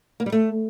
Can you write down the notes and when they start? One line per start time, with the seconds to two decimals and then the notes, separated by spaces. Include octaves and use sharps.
0.20 A#3
0.26 G3
0.32 A3